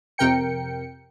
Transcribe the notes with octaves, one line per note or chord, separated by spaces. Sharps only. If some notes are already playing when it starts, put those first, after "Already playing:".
F2 C3 A#4 G5 C#7